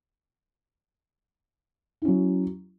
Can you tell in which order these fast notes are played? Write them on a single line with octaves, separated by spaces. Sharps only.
E4 C#4 F#3